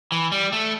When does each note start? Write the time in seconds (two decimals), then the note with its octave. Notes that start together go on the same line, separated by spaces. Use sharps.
0.12 E3
0.32 G3
0.52 A3